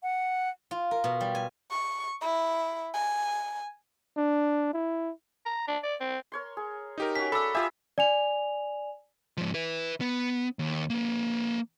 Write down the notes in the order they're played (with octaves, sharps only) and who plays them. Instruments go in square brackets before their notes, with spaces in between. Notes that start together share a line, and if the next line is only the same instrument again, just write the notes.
[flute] F#5
[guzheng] F4
A#4
B2
G3
G#5
[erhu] C#6
E4
G#5
[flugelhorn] D4
E4
[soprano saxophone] A#5
D4
D5
C4
[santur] A#4 C#5 C6
G#4
[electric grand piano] D#4 G4 A#4
[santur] C#4 F#4 [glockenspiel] B6
[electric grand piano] A4 [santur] A#4 D5 E5 [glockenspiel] B5 E6
[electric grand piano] F4 E5 [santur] G4 G#4 C6
[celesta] D5 G#5 F7
[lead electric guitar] G#2 F3
B4 E5
B3
D#2
A#3 B4